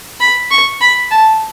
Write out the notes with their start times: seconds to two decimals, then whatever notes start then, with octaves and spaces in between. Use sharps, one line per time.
0.20 B5
0.51 C#6
0.81 B5
1.11 A5